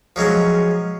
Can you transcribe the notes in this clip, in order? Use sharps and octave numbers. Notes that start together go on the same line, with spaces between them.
F3 F#3 G#3 C#4